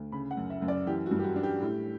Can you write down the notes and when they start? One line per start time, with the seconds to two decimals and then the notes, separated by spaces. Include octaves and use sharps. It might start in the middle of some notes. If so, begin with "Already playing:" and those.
Already playing: D2
0.12 C#3 B5
0.31 F#5
0.37 F#2
0.50 E5
0.62 F#2
0.68 D5
0.87 E3 G4
1.06 F#4
1.11 G2
1.19 G4
1.24 F#4
1.36 D4
1.43 G4
1.61 A2